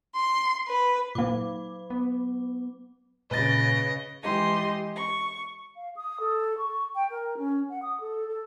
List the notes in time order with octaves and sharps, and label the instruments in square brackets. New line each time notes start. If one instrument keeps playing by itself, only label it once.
[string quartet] C6
B4
[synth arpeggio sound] A#2 A#3 [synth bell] F#3 D6
[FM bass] B3
[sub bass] A#2 [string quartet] C#3 [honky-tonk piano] B4 A6 [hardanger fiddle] D#5
[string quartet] E3 G#3 G4 D#5 C6
C#6
[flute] F5
D#6
A4
C#6
G5
A#4
C#4
F#5
D#6
A4
A4